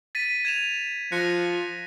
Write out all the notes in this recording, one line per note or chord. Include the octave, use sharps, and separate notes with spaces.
A6 B6 D#7
G#6 E7 F7
F3 F#6 A#6 C#7